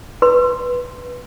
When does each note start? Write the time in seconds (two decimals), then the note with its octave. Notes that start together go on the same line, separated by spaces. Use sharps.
0.22 B4 C6